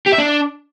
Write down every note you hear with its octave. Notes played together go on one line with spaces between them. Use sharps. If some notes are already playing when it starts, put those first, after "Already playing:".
G4
E5
D4